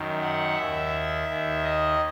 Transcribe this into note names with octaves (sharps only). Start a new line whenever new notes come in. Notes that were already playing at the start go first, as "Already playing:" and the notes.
Already playing: F#2 D#3
F#5
D#2 D#3 E5
D#2 D#3
D#5